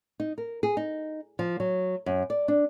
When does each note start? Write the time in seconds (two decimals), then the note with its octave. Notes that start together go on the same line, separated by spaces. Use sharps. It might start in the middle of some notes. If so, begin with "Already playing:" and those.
0.20 D#4
0.38 A#4
0.63 G#4
0.77 D#4
1.39 F3
1.60 F#3
2.06 F#2
2.30 D5
2.48 D4